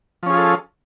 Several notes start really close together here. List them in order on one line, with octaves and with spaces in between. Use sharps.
F3 C#4 G#4 F4 A4